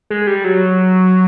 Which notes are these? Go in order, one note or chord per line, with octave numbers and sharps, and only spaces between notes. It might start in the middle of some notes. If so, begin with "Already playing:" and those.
G#3
G3
F#3